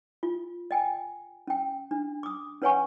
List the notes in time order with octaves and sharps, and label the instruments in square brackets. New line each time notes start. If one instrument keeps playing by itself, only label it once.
[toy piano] F4
D#5 G5 G#5
C#4 G5
D4
D6 D#6
C#4 B4 C#5 F#5 G#5 C#6